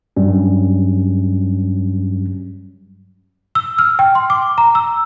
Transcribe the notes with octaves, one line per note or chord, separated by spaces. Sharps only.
G2 F#3 G3 C#4
E6
F6
G5
C6
D6
A#5
E6